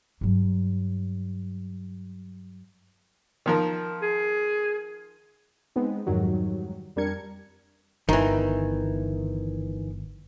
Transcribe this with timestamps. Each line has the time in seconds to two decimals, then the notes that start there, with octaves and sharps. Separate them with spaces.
0.21 G2 F#3
3.46 D#3 F3 A#4
4.02 G#4
5.76 G#3 B3 C4 D#4
6.06 F2 G#2 D#3 F#3 G3
6.96 F2 G3 D4 A#4 G#6 C#7
8.09 G1 D#3 E3